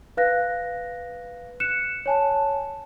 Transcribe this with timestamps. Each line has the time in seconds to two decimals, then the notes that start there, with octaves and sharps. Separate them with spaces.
0.17 B4 F5 F#6 A#6
1.60 F#6 C#7 E7
2.06 C#5 G#5 A5